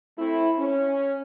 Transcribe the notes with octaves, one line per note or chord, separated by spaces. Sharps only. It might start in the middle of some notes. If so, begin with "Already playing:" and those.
A3 C4 E4
C#4